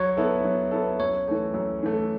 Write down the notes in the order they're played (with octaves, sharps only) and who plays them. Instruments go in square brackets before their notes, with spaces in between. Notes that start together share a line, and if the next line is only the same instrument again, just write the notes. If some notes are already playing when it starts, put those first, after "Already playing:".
Already playing: [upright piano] F#3 [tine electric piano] C#5
[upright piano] B3 E4 A4
F#3
B3 E4 A4
[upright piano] F#2 [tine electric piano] C#5
[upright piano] E3 A3
F#2
E3 A3